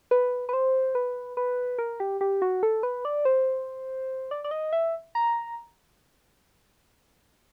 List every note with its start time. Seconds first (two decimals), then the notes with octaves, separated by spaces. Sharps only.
0.11 B4
0.49 B4
0.53 C5
0.95 B4
1.37 B4
1.79 A#4
2.00 G4
2.21 G4
2.42 F#4
2.63 A4
2.83 B4
3.05 D5
3.25 C5
4.31 D5
4.44 D5
4.51 D#5
4.73 E5
5.15 A#5